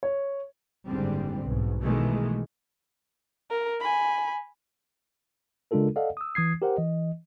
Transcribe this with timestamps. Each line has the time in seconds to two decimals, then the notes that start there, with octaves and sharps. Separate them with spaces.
0.03 C#5
0.87 F#1 G#2 D3 G3 C4
1.44 B1 G#2
1.81 B2 D#3 E3 G#3 A3
3.50 A#4
3.80 G#5 B5
5.71 C#3 G#3 D4 F4 A4 A#4
5.96 A4 D5 D#5 F5 F#5
6.17 D#6 E6
6.35 E3 D#6 G#6 C7
6.62 G4 A#4 C5 F#5
6.77 E3 D#5